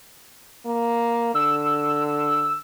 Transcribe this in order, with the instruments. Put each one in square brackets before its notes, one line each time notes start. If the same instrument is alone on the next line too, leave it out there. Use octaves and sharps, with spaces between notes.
[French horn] A#3
[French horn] D3 [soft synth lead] E6